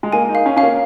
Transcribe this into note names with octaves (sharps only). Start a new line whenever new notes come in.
G#3
A#3 G#5
D#4
F5
C#4
C#4 F5
A#3